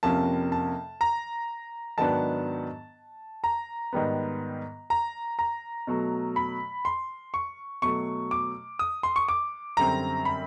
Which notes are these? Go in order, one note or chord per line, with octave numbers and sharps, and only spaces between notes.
F2 C3 F3 A#3 C#4 A5
A5
A#5
G#2 D#3 F#3 B3 D4 A5
A#5
G#2 D#3 G3 B3
A#5
A#5
B2 F#3 A3
B5
C6
C#6
B2 F#3 A3 C#6
D6
D#6
C6
C#6
D6
F#2 D3 G3 C4 A#5
B5